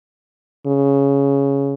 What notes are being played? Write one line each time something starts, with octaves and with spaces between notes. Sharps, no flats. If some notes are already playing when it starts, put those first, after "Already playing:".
C#3